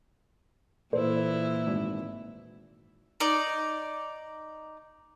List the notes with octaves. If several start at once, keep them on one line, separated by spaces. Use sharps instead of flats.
A#2 E3 E4 A4 C5
G#1
D#4 D5